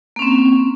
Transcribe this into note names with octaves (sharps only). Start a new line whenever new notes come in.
A#3 C4 C#4